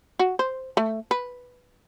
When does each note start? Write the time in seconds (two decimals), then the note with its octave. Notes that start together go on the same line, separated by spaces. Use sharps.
0.19 F#4
0.39 C5
0.77 A3
1.11 B4